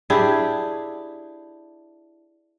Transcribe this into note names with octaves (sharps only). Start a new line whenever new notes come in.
D4 E4 G4 G#4